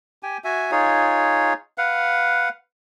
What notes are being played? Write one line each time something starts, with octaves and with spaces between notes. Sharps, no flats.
G4 G5 G#5
F#4 E5 G#5
D#4 F4 G#4 C#5
B4 F5 F#5